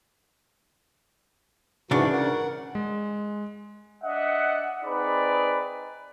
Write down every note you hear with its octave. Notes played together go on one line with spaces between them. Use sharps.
G#2 C#3 E3 D4 F#4
A#4 F#5
G#3
D4 D#5 E5 F#5
C4 D#4 G#4 B4 D5 B5